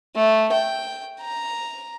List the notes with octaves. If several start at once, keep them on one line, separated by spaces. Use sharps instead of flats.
A3
G5
A#5